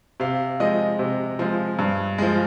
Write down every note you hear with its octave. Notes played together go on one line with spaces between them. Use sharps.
C3 F5
F3 G#3 D#5
C3
F3 G#3
G2
F3 G#3